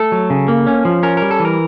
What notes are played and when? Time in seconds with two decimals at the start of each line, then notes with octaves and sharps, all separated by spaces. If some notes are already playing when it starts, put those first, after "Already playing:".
Already playing: A3 A4
0.12 F#3
0.30 C#3
0.48 A#3
0.67 C#4
0.85 F3
1.03 C#4 A#4
1.17 G3 A#4
1.31 A4
1.40 E3
1.45 A#4